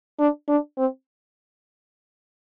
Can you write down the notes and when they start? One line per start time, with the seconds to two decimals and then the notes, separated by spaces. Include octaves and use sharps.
0.19 D4
0.49 D4
0.78 C4